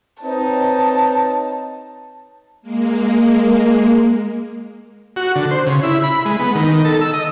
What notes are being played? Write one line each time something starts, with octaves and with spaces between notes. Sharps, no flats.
C4 D#4 B4 C#5 A5
G#3 A#3
F#4
D3
C5
C#3
E4
B5
G#3
B3
D#3
A4
E6
D#5